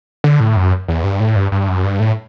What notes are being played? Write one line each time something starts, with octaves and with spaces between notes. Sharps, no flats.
D3
A2
F#2
E2
G2
A2
G2
G2
F#2
G2
A2